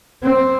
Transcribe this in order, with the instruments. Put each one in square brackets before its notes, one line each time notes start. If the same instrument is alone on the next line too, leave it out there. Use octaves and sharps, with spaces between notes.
[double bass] C4